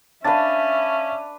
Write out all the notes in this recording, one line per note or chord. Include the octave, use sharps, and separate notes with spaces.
C#4 D4 B4 E5 F5 A5 A6